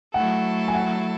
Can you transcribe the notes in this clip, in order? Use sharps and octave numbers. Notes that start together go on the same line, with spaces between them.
F#3 A3 E4 A4 F#5
G#5
F#5